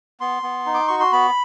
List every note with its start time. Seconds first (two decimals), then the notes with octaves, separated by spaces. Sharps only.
0.20 B3 C6
0.43 B3
0.66 D#4
0.74 D6
0.88 F#4 C#6
1.00 C6
1.12 B3 B5